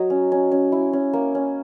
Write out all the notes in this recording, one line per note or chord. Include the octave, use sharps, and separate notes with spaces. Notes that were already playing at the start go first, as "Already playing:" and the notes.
Already playing: F#3 C#5 D#5
C#4
C#4
C#4
E4
C#4
A#3
C#4